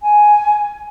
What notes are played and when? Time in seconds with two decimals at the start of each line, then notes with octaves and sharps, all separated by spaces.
0.01 G#5